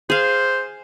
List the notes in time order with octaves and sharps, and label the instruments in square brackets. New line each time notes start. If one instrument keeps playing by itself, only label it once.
[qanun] G#4 F5 [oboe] C5